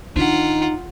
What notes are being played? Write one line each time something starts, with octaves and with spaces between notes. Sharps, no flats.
D#3 D4 D#4 F4 F#5